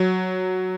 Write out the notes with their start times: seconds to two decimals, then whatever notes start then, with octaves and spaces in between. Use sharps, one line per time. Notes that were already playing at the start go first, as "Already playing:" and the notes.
Already playing: F#3